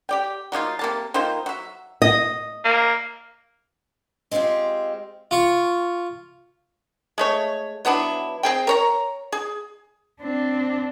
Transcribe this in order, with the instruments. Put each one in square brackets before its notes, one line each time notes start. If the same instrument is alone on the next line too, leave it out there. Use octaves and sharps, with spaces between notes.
[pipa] G4 D5 G5
F#3 A#3 D#4 F4
C3 A#3 A5
D#3 A#3 F4 C5
F#3 E5
[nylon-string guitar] D#5
[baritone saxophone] A#3
[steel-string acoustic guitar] G#3 C4 D#4 F4 G4
[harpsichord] F4 C#6
[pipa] G#3 A3 C#5
F#3 B3 D4 E4
C4 G#4 G5
A#4 C#5 A#5
G#4
[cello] C4 D4